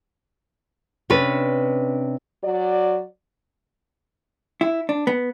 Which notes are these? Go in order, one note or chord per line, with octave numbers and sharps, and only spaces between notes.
C3 C#4 D4 B4
F#3 F#4 D5
E4
D4
B3